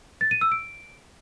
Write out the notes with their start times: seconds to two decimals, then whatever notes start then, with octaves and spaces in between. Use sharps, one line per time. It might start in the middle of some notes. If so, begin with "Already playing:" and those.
0.21 A6
0.31 D#7
0.41 E6
0.52 D7